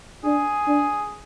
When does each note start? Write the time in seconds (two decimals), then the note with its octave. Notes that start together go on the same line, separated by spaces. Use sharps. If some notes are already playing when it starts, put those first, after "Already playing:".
0.24 D4 G#4
0.67 D4